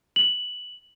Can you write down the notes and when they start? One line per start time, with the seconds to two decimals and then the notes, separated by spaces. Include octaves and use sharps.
0.16 F#7